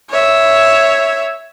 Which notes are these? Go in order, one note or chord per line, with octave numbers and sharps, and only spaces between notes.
C#5 E5